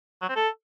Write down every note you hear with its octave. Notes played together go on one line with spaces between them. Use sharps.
F#3
C4
A4